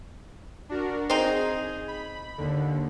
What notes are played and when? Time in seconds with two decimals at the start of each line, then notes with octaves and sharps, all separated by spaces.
0.69 D4 F#4 A#4
1.10 C4 D#4 G#4
1.88 B5
2.38 D#2 D3